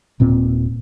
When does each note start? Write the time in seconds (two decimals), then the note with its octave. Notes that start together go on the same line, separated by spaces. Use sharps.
0.20 D#1 A#2 C4